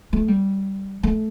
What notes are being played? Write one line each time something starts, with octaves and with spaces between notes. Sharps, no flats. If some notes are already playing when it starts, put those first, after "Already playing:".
A3
G3
A3